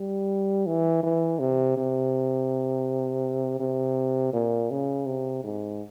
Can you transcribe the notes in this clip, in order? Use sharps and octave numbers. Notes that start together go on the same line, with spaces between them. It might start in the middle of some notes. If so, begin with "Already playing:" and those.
Already playing: G3
E3
E3
C3
C3
C3
A#2
C#3
C3
G#2